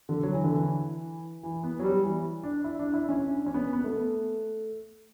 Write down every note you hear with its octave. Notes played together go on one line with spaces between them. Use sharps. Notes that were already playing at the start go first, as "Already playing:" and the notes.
D3
F#3
E3
D3
E3
E3
B3
F#3
G3
E3
D4
E4
D4
E4
C#4
D4
C#4
B3
B3
A3